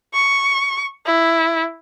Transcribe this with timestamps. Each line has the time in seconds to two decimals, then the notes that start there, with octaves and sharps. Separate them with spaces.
0.14 C#6
1.06 E4